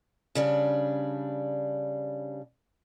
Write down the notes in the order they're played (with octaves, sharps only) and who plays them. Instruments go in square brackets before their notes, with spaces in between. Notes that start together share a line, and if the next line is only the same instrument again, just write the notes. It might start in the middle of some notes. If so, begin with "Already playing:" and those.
[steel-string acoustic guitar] C#3 G3 D4